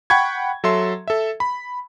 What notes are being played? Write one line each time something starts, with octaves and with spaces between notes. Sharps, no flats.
F#5 G5 B5 C#6 G#6
F#3 A4 E5 C6
A4 E5
B5